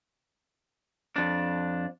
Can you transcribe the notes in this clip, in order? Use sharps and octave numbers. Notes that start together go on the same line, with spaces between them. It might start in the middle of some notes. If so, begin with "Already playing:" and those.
F2 D4